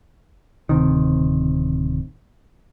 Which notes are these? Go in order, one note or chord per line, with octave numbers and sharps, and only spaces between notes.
D1 C3 D#3